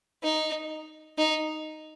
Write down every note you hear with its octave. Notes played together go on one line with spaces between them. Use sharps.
D#4
D#4